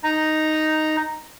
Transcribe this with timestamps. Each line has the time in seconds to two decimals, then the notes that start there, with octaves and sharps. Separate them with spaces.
0.04 D#4 A#5